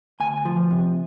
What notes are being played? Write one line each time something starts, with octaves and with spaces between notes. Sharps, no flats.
D2 G#5
F3
C3